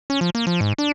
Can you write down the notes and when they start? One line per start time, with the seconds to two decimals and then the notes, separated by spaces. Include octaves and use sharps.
0.10 C#4
0.21 F3
0.35 A#3
0.47 F3
0.61 G#2
0.78 D4